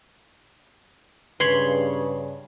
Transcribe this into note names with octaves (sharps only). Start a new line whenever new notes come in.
G2 C#3 B4 C#5 B5 C6